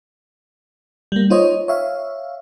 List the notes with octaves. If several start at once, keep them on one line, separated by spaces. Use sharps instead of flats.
G3 A#3
D#4 F4 C5 C#5 D#5
C#5 E5 F5